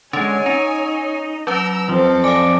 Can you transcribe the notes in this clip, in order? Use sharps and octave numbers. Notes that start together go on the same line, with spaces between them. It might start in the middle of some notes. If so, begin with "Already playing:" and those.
D3 G#3 C#4 C#5 G#5
C#4 D#4
F#3 C#4 B4 A#5 E6
F2 F3 C4 A4
D5 F5 G#5